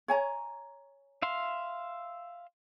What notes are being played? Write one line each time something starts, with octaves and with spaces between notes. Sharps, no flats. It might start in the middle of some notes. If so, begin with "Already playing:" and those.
C#5 G#5 A#5
E5 F5 C6